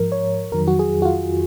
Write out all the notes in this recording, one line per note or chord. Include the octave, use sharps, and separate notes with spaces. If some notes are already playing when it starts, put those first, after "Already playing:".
Already playing: G#2 F3 A#4
C#5
F2 D#3 F#3 A#4
F#4
G#4
F#4
F4